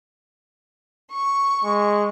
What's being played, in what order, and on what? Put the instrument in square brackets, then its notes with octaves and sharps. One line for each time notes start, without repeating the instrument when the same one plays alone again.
[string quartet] C#6
[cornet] G#3